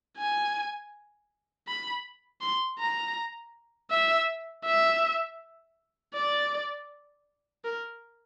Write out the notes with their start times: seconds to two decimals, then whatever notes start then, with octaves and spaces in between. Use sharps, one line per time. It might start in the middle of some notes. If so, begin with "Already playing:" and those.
0.18 G#5
1.67 B5
2.41 C6
2.79 A#5
3.91 E5
4.65 E5
6.14 D5
7.64 A#4